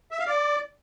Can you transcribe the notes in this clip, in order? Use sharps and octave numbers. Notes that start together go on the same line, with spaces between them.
E5
F5
D5